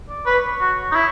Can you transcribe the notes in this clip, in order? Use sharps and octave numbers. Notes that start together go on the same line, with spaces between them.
D5
B4 C#5
F#4
D#4
E4